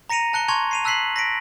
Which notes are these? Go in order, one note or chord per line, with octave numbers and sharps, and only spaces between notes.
A#5 A#6 C#7 D#7 F7
A5 F#6 C#7 G7
G#5 A5 C6 C#6 G#6 F7
C7 D#7 F7
A5 E6 F#6 B6 C7 F#7
A#6 B6 D7